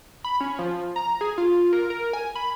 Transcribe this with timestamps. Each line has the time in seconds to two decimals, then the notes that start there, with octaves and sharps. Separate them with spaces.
0.24 B5
0.40 C#4
0.59 F3
0.96 A#5
1.21 G#4
1.38 F4
1.73 A#4
1.90 A#4
2.13 G#5
2.35 B5